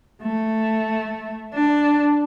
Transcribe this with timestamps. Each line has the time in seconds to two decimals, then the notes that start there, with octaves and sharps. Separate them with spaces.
0.21 A3
1.54 D4